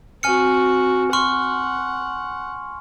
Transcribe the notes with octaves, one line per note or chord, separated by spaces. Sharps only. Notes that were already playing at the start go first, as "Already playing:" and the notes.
C4 F#4 G#5 F6 C#7
F#5 C6 C#6 F6